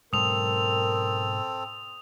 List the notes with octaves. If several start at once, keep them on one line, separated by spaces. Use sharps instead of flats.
G#2 B2 F#3 C4 A4 A#4 D#6 F7